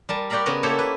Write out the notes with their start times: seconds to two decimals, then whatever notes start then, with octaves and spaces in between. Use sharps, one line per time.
0.09 G3 A#4 A5
0.30 F#4 G4 D5 F5 A#5 B5
0.46 C#3 B3 F#4 A#4
0.63 A#3 E4 G4 A4 C5 C#5
0.79 B4